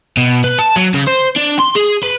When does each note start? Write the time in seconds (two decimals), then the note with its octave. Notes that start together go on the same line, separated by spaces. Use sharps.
0.17 B2
0.44 B4
0.59 A5
0.76 F#3
0.94 C#3
1.08 C5
1.37 D4
1.60 C6
1.76 G#4
2.03 B4